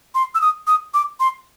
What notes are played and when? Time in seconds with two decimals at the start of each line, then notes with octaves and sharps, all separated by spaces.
0.15 C6
0.35 E6
0.41 D#6
0.67 D#6
0.94 D6
1.20 C6